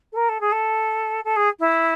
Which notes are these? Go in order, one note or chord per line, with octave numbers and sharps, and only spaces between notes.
A4
A#4
A4
G#4
A4
A4
G#4
E4